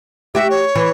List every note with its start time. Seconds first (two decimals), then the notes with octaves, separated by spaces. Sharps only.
0.35 F#4 G4 E5
0.50 C#5
0.75 E3